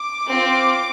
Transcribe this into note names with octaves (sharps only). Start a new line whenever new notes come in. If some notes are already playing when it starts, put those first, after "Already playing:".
Already playing: D6
C4 F4